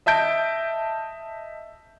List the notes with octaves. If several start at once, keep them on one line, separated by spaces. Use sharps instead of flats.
D#5 E5 A5 G6 D7